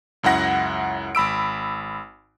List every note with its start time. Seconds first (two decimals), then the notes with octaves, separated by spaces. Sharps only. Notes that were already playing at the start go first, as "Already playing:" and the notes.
0.23 C#2 F#2 E4 F#5 A#6
1.15 G#1 B5 E6 D7